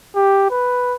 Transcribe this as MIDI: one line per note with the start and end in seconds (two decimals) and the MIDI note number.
0.15 0.46 67
0.51 0.96 71